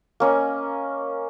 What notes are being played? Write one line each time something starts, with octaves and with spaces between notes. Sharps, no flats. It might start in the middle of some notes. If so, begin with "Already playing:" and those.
A#3 C#4 D#5